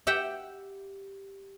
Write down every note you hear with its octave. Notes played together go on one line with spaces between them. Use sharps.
G4 E5 F#5 G5